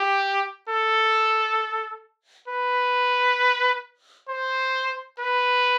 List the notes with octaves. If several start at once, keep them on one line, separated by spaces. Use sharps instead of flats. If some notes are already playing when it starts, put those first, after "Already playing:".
Already playing: G4
A4
B4
C5
B4